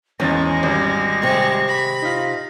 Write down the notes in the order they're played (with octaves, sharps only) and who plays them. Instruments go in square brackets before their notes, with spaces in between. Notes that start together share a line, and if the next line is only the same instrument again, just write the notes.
[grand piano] G#1 E2 A6 [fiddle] G#3 [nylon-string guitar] C#4 [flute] A#6
[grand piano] G#1 G3
[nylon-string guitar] C3 [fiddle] G#3 C#6
[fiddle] B5
[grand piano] D#4 F4